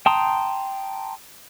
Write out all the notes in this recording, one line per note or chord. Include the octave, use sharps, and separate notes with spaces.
G5 A5 A#5 C6 D#6